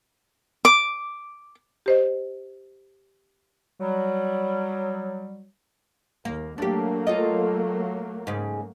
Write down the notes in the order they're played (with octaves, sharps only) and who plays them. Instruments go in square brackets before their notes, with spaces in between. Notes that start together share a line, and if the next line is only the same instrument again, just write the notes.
[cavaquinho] D6
[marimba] G4 C5 D#5
[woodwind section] F#3 G3
[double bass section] D#2 [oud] A#3
[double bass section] F#3 A3 A#3 [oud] D4 G4
[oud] F4 A4 D#5
G#2 C#3